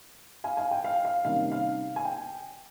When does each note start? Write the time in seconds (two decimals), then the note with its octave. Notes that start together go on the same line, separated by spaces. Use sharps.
0.44 F5 G#5
0.57 F5 G#5
0.71 G5
0.84 F5
1.05 F5
1.25 C3 D#3 G3 A#3 C#4 F5
1.52 F5
1.96 G#5
2.05 G5